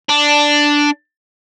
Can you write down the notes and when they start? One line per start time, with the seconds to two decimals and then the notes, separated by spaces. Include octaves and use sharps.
0.09 D4